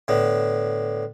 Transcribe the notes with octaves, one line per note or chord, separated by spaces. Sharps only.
A2 D3 B3